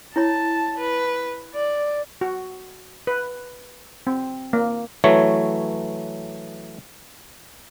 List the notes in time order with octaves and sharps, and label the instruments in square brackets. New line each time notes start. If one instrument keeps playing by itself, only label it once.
[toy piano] E4 C#5 B5 [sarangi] A5
[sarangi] B4
D5
[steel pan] F#4
B4
C4
A#3
[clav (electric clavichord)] E3 F#3 A3 C#5